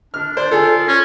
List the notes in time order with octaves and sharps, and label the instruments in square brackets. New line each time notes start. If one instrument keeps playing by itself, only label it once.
[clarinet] D4 [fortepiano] F6
[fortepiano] C5 [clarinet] D5
[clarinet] F4 [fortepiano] G#4 A4
[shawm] C#4 [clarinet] C#5